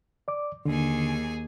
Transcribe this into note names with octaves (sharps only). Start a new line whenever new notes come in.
D5 D6
D#2 D3 G#4 G#5